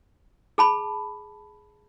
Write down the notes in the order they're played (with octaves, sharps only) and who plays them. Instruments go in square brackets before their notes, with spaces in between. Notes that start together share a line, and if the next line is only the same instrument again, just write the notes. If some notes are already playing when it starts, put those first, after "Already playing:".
[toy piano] G#4 A5 B5